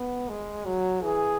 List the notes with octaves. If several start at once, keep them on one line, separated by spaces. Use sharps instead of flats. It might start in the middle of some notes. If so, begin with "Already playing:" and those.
Already playing: B3
G#3
F#3
E3 G#4